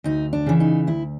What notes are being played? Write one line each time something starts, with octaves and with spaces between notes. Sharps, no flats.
D2 D#4
D4
C#3 E3
D#4
D2 E4